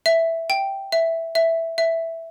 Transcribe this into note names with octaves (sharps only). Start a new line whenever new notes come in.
E5
G5
E5
E5
E5